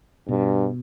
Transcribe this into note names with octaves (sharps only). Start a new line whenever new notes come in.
G2 B2